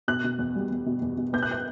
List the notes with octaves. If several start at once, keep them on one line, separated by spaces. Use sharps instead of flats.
B2 F#6
B2
E2
G3
E2
B2
E2
B2
B3 G6
F#6
G6